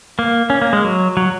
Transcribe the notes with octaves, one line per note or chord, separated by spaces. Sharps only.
A#3
C#4
A#3
G#3
F#3
F#3